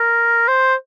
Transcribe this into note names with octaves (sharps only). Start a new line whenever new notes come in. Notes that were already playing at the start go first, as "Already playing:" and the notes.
Already playing: A#4
C5